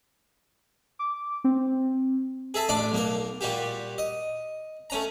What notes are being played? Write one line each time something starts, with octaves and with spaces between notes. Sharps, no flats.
D6
C4
G#4 A4 E5 A5
A1 D4 D5 D6
B1 A#3 A#4
A#2 G3 A#3 F#4 G4
D#5
A3 C#4 A#5